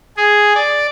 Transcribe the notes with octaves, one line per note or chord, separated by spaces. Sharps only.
G#4
D5